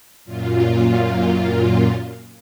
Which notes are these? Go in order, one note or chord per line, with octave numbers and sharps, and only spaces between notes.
F#2 A#2 F4